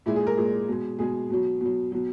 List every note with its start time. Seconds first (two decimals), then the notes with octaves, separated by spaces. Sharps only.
0.06 A#2 G#3 E4
0.16 G#4
0.27 A#4
0.37 A#2 G#3
0.68 B2 G#3
0.99 B2 G#3 G#4
1.30 B2 F#3
1.61 B2 F#3
1.92 B2 F#3